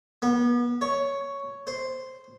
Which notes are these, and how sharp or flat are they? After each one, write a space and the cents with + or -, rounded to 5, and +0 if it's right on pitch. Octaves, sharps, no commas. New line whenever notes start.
B3 -35
C#5 +5
C5 -5